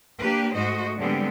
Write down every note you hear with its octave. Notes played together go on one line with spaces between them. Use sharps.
A#3 D4 G4 B4
G#2 A3 F#4 C5 D#5
D3 G3 G#3 B3 C4 D4